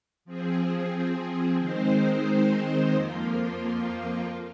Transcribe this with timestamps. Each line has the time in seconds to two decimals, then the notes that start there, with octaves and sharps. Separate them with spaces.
0.25 F3 C4 G#4
1.59 D#3 G#3 C4 D#4 C5
2.92 F2 F3 A#3 F4